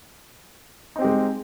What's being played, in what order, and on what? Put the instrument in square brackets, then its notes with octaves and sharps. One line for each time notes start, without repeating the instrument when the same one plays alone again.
[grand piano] D#4
C4
G4
G#3